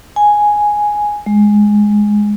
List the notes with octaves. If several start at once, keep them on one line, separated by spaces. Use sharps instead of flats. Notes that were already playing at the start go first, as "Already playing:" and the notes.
G#5
G#3